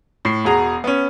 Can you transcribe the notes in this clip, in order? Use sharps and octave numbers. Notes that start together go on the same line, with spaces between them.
A2 C7
E1 F#4 G#4 A#5
B3 C#4